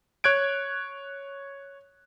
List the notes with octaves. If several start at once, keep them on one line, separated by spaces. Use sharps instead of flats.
C#5 F#6 G#6 D7